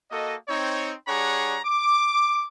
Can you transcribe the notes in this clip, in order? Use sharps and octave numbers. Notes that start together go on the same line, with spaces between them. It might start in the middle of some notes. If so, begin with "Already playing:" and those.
A#3 F#4 A4 D#5
C4 D#4 C#5
G3 D4 G#4 C#5 F#5 A#5
D6